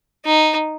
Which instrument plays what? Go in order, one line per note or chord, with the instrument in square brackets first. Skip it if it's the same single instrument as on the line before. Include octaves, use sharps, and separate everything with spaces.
[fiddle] D#4